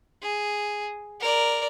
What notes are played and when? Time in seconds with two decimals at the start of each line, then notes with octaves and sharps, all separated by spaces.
0.22 G#4
1.20 A#4 D5